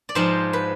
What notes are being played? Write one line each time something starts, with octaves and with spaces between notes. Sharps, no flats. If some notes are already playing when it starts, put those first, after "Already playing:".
D5
G#2 F3 G#3 C5
B4